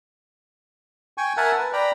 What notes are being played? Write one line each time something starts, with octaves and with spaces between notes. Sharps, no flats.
G5 G#5 C#6
A#4 E5 F#5 G#5 A5
B4
D5 G5 A#5 B5